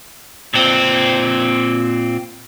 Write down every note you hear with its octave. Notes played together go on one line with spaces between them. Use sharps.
A#2 C4